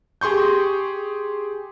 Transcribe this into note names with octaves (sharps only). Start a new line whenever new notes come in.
G4 G#4 C6 C#6 G6